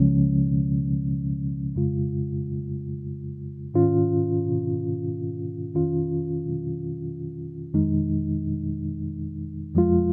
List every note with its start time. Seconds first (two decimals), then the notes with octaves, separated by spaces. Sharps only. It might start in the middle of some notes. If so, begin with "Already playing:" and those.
Already playing: C#2 C#3 F3 G#3 C#4
1.75 F2 C#3 G#3 F4
3.74 G#2 D#3 C#4 F4
5.74 F2 D#3 C#4 F4
7.74 F2 D#3 G#3 D#4
9.74 F2 F3 G#3 F4